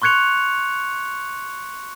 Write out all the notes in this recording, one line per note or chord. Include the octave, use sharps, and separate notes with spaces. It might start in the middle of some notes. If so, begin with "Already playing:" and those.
C6 C#6 F#6 G#6 C#7 F7